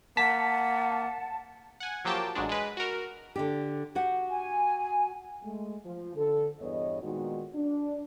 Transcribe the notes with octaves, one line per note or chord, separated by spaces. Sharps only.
A#3 F#5 A5 B6
F#5 G#5
F3 F#3 A#3 G4 G5 A5
A1 F#3 G#3 D4
G#3 B4
F#4 A#4
D3 D4 G4
F#4 G4 F#5
G#5
G#3 A3
F3
D3 A4
E2 G2 B3 C#5 D#5
A#2 D#3 G#3 B3 D#4 F#4
D4